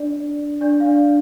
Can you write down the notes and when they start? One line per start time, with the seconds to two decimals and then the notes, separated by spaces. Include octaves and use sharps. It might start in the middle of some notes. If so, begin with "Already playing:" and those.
Already playing: D4 D5
0.61 D4 D5
0.80 F5
0.85 D4 D5